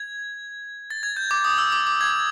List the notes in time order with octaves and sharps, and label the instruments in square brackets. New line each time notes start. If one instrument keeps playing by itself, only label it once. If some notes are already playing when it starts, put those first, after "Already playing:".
Already playing: [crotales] G#6
A6
G#6
G6
D6
D#6
E6
D6
D6
G#6